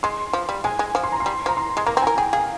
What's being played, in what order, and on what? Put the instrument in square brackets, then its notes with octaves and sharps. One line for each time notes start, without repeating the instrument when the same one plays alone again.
[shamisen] G#3 [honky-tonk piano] C6
[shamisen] F3
G3
[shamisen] G#3 [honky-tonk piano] G#5
[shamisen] G#3
F3
[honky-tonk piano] C6
A#5
C6
[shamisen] G3
[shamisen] F3 [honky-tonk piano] A#5
[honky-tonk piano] C6
[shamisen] G#3 [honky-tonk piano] C6
[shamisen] A#3 [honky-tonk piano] A#5
[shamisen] C4
[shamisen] A#4 [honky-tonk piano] G#5
[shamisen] G#4 [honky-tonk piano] G5
[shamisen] G#4 [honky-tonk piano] F5